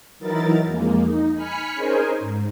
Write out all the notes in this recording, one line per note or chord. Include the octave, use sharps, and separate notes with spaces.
E3 F#3 D#4 E4 A#4 A6
F2 G#3 A#3
D#4
G#5 B5 F6 B6 C#7
C#4 D#4 G#4 A#4 C5 G#5
G#2